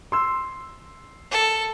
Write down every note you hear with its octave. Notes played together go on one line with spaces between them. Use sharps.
C6 E6
A4